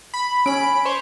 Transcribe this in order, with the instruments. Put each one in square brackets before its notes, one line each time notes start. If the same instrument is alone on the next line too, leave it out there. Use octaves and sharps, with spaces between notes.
[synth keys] B5
[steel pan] C#4 [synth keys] B5 D7
[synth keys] C5 C#5